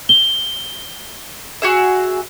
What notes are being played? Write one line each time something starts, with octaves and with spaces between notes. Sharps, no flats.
G7
F#4 G#4 E5